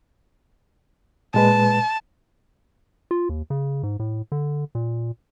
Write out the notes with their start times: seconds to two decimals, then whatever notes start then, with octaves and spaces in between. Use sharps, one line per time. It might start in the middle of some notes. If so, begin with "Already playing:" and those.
1.34 A#2 G#3 B4 A5
3.11 F4
3.29 D#2
3.50 C#3
3.83 G#2
4.00 A2
4.32 D3
4.75 A#2